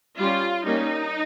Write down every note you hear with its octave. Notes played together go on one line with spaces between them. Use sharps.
G3 C#4 F4
G3 A#3 C#4 D#4